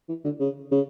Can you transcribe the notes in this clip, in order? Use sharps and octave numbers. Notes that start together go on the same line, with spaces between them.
E3
D3
C#3
C#3